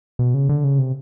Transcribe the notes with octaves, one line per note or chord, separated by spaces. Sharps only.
B2
C#3
D3
C#3
C3